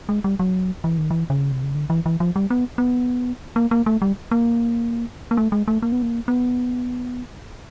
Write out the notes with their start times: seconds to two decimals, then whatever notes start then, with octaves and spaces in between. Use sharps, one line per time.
0.09 G#3
0.24 G3
0.39 F#3
0.84 E3
0.98 D#3
1.11 E3
1.30 C#3
1.52 C3
1.63 C#3
1.75 D3
1.90 E3
2.06 E3
2.20 F3
2.36 G3
2.50 B3
2.78 B3
3.56 A#3
3.71 A#3
3.86 A3
4.02 G3
4.31 A#3
5.31 A#3
5.37 A3
5.52 G#3
5.68 A3
5.82 A#3
5.92 B3
6.02 A#3
6.28 B3